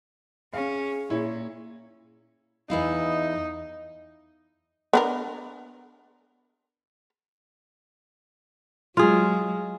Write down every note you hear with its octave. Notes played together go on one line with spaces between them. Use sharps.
C#4 G#4 F5
A#2 E4 C#5
E2 D#4 E4 F5
B3 D4 A#4
F#3 G#3 F4 G#4